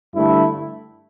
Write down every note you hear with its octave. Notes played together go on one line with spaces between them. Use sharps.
G2 D3 A3 E4